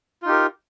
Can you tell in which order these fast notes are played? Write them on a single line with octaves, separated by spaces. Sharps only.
F4 D#4 G4 A#4